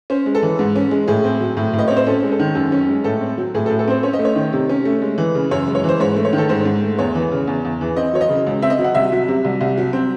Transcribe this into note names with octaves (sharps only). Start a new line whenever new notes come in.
C#4 C5
G#3
A4
E3
G#2
C#4
G#3
A2 G#4
C4
F#3
A2
A2
D#5
C4 C#5
C5
C#4 A4
G#3
A4
D#3
F#2
C#4
G#3
A2 A4
C4
F#3
A2 G#4
A4
A2
A4
C4 C5
C#4 C#5
D#5
A3
C#5
D#3
C3
C#4
A3
G#3
E3
C#3
F#2 C#5
G#3
C#5
E3 C5
G#2 C#5
A3
C#5
D#3
A4
G#2 C5
G#2
A3
E2 C#5
E3
C#3
E2
E2
E3
C4 D#5
F#3 C#5
D#5
C#3
C#2
C4 E5
D#5
F#3
F#5
C2 E5
F#3
C3
C2
C2
F#3
C4